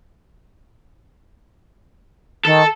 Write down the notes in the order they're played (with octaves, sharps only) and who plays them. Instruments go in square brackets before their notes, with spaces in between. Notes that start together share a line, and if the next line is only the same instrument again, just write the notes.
[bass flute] D#3 [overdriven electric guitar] A4